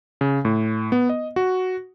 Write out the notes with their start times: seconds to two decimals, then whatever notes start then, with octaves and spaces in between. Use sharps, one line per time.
0.21 C#3
0.45 A2
0.92 B3
1.09 D#5
1.36 F#4